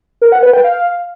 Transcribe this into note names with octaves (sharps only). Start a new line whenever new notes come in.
A#4
F#5
B4
G5
F5